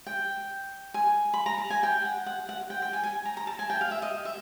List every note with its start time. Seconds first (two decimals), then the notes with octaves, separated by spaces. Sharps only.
0.07 G5
0.94 G#5
1.34 B5
1.46 A#5
1.58 A5
1.70 G#5
1.83 G5
2.05 F#5
2.26 F#5
2.49 F#5
2.70 G5
2.82 G5
2.93 G#5
3.03 G#5
3.25 A#5
3.37 A#5
3.47 A5
3.59 G#5
3.70 G5
3.81 F5
3.91 E5
4.02 D#5
4.25 E5